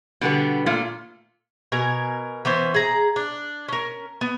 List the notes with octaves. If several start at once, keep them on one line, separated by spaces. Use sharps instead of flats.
B2 D3 G3 B3
A#2 A3 F4
B2 A#4 G#5
E3 B3 C#4 C5
G#4 A#5
D4
C#4 A#4
B3